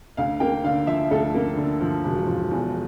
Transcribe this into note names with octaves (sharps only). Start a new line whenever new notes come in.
D2 F5
A#3 G5
D3 F5
F3 E5
D2 A4
A#3
D3
F3
E1
F3
E2